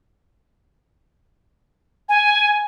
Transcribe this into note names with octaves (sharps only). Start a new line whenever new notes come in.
G#5